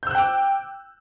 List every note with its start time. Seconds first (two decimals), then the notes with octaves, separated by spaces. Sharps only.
0.03 G6
0.07 E6
0.11 F#6
0.15 G5
0.19 D6